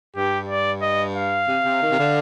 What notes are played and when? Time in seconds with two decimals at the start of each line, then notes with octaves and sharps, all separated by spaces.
0.16 G2 G4
0.49 D5
0.82 D#5
1.15 F5
1.48 C3
1.64 C3
1.82 D#3
1.91 C3
1.98 D3